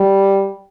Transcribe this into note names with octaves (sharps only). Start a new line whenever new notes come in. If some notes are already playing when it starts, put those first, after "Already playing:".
Already playing: G3